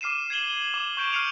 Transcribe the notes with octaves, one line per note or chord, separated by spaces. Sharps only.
D6 F6 C7 D#7 E7
G#6 C7 E7 F#7 G7
G7
D6
C#6 G6 D7
F6 C7 C#7 D#7 F7